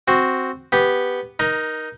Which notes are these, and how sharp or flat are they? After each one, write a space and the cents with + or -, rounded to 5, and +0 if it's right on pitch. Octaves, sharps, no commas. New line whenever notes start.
C4 +0 F#4 +0
B3 +0 G4 +0
D#4 +0 A#4 +20